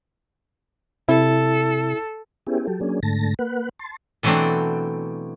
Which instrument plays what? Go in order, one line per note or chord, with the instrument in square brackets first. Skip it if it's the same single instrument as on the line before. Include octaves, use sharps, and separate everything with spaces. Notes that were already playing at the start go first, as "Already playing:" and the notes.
[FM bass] C3 [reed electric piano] E4 [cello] A4
[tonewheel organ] B3 C#4 E4 G4 G#4
F#3 G4 A4
F#3 A#3 C#4 D4 G#4
G#2 D3 A3 A5 A#6
A#3 B4 F#5
A5 C6
[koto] B2 E3 F#3 A3 C4 D4